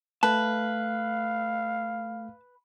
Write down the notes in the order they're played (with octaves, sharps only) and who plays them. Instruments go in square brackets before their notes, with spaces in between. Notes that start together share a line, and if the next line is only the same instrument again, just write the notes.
[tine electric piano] A3 [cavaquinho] B4 [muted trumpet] F5 [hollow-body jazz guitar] A5